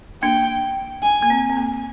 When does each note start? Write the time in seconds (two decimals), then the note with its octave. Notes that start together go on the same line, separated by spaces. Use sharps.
0.23 A#3 D4 G5
1.03 G#5
1.22 A#3
1.30 C4
1.50 C4
1.57 A#3